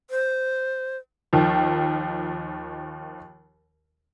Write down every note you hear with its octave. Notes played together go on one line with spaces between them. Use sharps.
C5
D#2 D#3 F3